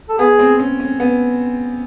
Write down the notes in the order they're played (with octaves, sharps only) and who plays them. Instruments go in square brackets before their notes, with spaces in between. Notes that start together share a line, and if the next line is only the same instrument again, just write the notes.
[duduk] A4
[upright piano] B3 [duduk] G#4
[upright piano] C4
C#4
C#4
B3